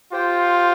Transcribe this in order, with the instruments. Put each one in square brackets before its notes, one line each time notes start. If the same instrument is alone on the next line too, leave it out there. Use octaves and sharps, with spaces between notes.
[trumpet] F4 [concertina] G4 C5 G5